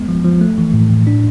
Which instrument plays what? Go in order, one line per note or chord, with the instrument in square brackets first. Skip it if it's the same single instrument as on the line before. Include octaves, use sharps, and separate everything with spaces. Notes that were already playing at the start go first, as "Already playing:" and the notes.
Already playing: [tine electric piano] G#3 B3
F3
F3
A3
E3
A2
A2
D4